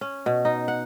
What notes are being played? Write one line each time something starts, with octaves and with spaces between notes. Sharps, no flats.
C#4
B2
D#4
F#5